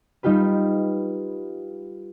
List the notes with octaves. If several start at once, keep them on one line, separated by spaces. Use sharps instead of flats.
G3 D#4 F4 G4 B4